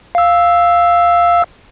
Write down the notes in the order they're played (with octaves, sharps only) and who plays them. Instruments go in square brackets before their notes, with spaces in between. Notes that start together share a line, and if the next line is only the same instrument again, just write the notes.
[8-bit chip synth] F5 E6